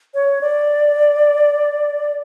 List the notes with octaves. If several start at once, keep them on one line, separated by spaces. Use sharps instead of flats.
C#5
D5